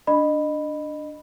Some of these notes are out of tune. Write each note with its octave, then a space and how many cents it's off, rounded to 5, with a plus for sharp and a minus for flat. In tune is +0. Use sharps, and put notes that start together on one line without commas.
D4 +0 D#5 -25 B5 +0